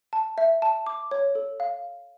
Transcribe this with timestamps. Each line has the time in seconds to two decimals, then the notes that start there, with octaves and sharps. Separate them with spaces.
0.13 A5
0.38 E5
0.62 A5
0.86 D6
1.11 C#5
1.35 A4
1.60 F5